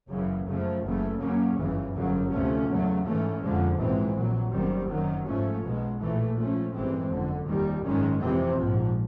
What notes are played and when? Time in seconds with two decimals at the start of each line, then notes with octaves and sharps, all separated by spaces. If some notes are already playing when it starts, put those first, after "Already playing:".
0.09 F#1 F#2 C#3 E3
0.46 F#2 C#3 F3 A3
0.83 F#1 F#2 C#3 E3 A3
1.20 F#2 C#3 F#3 A#3 C#4
1.57 G1 F#2 C#3 E3
1.94 G1 F#2 C#3 F#3
2.31 D2 C3 F3 A3 C#4
2.68 E2 C#3 F#3 A3
3.05 G#2 E3 A3 C#4
3.41 F2 D3 F3 G#3
3.78 A#1 G#2 E3 G#3 C4
4.15 A#1 A#2 F#3
4.51 F#1 F#2 D#3 G3 C4
4.89 F#2 D#3 F#3
5.26 G#2 F3 A3 C#4
5.63 B1 B2 G#3
5.99 A#1 A2 E3 A3
6.36 G#2 F3 A3 C#4
6.73 A1 G2 E3 G#3 C4
7.10 F#1 F2 D3
7.47 F1 D#2 D#3 G3
7.83 G#1 F#2 D#3 G#3 C#4
8.21 F2 C3 E3 G#3 C4
8.58 A#1 G#2 F3